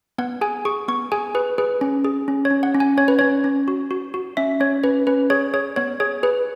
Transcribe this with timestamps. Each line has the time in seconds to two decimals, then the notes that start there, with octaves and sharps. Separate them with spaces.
0.18 B3 F#5
0.41 G#4 G#5
0.65 G#4 C#6
0.88 B3 C#6
1.12 G#4 G#5
1.35 G#4 B4
1.58 G#4 B4
1.81 C#4
2.05 G#4
2.28 C#4
2.45 C#5
2.51 C#4
2.63 F#5
2.75 C#4
2.80 G#5
2.97 C#4 C#5
3.08 B4
3.19 C#4 C#5
3.44 C#4
3.68 F#4
3.91 F#4
4.14 F#4
4.37 C#4 E5
4.60 C#4 C#5
4.84 C#4 B4
5.07 C#4 B4
5.30 G#4 C#5
5.54 G#4 C#5
5.76 B3 C#5
6.00 G#4 C#5
6.23 G#4 B4